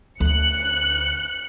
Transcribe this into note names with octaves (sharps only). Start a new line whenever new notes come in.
D2 F#6 C#7